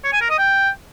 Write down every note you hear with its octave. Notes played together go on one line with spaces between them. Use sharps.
C#5
G#5
A#4
D#5
G5